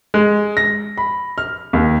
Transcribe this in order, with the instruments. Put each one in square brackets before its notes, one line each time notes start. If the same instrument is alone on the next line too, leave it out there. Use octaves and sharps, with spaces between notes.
[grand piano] G#3
A#6
B5
F6
D#2